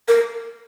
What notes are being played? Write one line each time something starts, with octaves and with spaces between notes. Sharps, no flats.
A#4